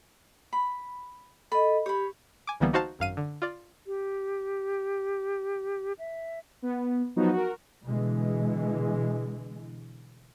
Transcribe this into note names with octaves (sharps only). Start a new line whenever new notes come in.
B5
A4 D#5 B5
G4 C#5 B5
G#5 D6
C2 D3 E3 G3 A#3 B3
D#4 F#4 C5 F5 A5
G#1 F#2 F5 D#7
D3
F4 D5
G4
E5
B3
F3 F#3 B3 D#4 F#4
F#4 A#4
B2 D3 E3 G#3